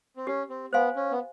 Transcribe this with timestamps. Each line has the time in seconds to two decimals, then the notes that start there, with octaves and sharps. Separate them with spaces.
0.16 C4
0.27 C#4 G4
0.50 C4
0.73 B3 C5 F5 G#5 C6
0.96 C#4
1.11 B3